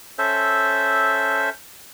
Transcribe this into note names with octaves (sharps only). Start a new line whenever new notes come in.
C#4 A4 C5 E5